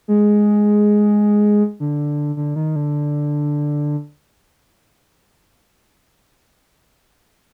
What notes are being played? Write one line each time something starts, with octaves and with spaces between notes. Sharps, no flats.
G#3
D3
D3
D#3
D3